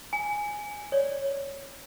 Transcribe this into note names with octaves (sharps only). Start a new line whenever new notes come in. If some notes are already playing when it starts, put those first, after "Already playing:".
G#5
C#5 D5